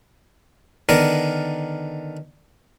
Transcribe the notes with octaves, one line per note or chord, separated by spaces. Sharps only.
D3 D#3 B3 D4 A#4 D5